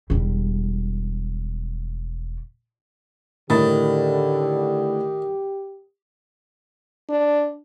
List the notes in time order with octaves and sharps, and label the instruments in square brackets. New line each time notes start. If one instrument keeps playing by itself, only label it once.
[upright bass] E1 G3
[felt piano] A2 B5 A6 [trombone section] D3 [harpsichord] D#3 [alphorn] G4
[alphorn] D4